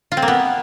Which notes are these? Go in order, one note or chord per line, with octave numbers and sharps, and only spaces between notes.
F4
C4
A#3
B3